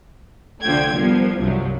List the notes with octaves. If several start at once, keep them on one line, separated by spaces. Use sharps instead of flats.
C2 D3 F3 A3 G5 G#6
F3 G3 B3 A#4
C2 G2 C3 F3 F#3